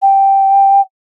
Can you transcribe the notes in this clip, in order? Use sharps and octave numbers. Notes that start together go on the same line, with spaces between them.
G5